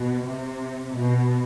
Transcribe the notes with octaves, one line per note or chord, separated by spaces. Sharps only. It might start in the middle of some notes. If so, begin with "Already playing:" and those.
Already playing: B2
C3
B2